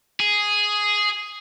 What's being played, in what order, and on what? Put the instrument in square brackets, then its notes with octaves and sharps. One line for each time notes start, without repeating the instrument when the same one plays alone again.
[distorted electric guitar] G#4